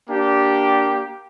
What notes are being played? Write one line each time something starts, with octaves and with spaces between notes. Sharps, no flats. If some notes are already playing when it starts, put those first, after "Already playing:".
A#3 D4 G4